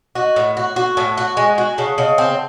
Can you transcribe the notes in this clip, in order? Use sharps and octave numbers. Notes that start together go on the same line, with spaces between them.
F#4 D#5 F#5
A2
F#4
F#4
A2 F#5 A5
F#4
G#3
F#4
C#3 F#5 A5
C#3 D#5 F#5
C4 F#5 A5